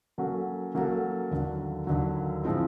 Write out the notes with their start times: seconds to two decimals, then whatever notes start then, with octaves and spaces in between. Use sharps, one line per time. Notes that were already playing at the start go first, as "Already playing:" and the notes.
0.18 F#3 A#3 C#4 F#4 A4
0.75 F#3 A#3 C#4 F#4 A4
1.31 D#2 D3 F#3
1.87 D#2 D3 F#3
2.43 A2 F3 G#3 C4 F4